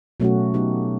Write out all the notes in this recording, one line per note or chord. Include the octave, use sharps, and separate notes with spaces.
B2 F#3 A3 C#4 F#4
F#3 B3 D#4 G4